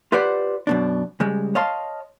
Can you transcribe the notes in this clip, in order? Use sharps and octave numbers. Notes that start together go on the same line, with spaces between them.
F4 G4 B4 C5 D5 F#5
F#2 B2 D4
C#3 G3 G#3
C#5 D#5 F5 A5 C6